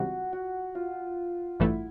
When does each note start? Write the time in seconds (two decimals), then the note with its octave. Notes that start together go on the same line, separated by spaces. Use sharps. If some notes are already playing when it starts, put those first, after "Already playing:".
Already playing: C#2 C3 E3 G3 F#4
0.33 F#4
0.75 F4
1.60 A1 G2 E3 A3 E4